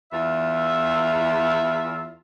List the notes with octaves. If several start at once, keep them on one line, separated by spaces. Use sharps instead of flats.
E2 F4 E5